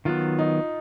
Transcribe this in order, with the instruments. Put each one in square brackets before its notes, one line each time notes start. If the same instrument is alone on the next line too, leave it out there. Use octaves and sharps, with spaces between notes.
[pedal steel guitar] D#3 F#3 B3 [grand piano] F4
[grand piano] D#4